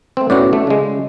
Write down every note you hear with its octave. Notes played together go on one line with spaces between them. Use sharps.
A3 C4
A2 B3 C#4 F#4 D5
A3
C#3 G#3